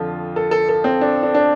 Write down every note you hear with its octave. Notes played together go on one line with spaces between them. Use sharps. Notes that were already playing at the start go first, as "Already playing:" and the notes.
Already playing: F2 D3 F3 F4
A4
A4
A4
C4
D4
D4
D4